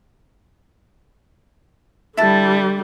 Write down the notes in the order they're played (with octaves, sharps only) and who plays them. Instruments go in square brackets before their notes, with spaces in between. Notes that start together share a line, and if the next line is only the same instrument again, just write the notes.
[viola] D3 G3 [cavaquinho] E4 A5